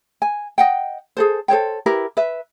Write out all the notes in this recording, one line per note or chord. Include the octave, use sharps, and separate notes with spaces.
G#5
D#5 F#5 G5
G#4 A4 C5
A4 C5 C#5 G5
E4 G4 A#4 B4
B4 E5